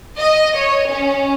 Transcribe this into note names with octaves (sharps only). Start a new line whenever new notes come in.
D#5
C#5
C#4